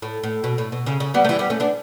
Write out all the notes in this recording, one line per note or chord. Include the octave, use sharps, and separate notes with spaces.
A2
A2
B2
A2
B2
C#3
C#3
G3 B3
A3
E3 G3
G3 B3
A3 C#4
B3 D4